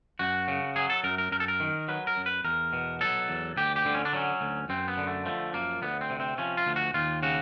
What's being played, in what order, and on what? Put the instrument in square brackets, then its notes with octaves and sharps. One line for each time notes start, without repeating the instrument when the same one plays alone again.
[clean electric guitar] F#2 F#4
C#3
F#3 G#4
A4
F#2 A#4
A#4
F#2 A#4
A4
A#4
D#3
F#3 B4
A#4
F#2
B4
E2 A#4
B2
F#3 A4
E2
D2 G4
G4
D3
C#4
D4
F#3 C#4
D2
F#2 C4
B3
D3
A3
F3 A3
F#2 A#3
D2 B3
C4
C3
C4
F3 C#4
F4
D2
F#4
D#2 F4
C#3 F#4